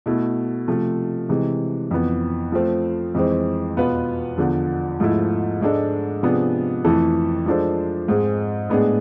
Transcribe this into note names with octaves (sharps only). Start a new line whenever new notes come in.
B2 A3 E4
C3 F3 A3
C3 E3 G#3
F2 E3 B3
F3 A3 C4
F2 E3 G#3 C4
E2 B2 B3 F4 B4
E2 D3 F3
G#2 F3 A3 E4
G#2 G#3 D4 A4
C3 F3 B3 D4 G#4
F2 E3 A3 E4 A4
F3 G#3 D4 A4 C5
G#2 G#3 C4 G#4
A2 G#3 B3 D4 G#4